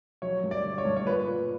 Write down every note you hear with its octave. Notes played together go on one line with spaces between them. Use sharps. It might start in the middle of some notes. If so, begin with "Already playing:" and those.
F#3 C#5
G2
D5
D3
C#5
G2
C#5
A#2 B4
A#2